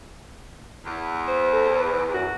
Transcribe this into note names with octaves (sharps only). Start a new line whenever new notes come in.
E2
C5
A4
B4
F#2 F#4